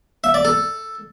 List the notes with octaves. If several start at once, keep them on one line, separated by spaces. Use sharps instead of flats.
E5
D5
A4